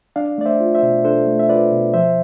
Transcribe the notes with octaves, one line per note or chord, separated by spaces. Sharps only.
D4 D5 F5
A3 D5
C5 E5
F4
C5 E5
B2
D4 A4 C5
A3
E5
F4 B4 D5
B2
F3 C5 E5